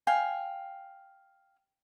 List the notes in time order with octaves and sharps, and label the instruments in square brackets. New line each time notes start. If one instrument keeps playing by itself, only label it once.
[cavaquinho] F5 G5 G#5